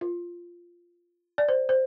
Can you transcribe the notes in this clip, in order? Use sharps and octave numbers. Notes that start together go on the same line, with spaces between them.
F4
D5
C5
C5